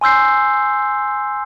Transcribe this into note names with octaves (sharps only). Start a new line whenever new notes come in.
G#5 C6 E6 G6 C7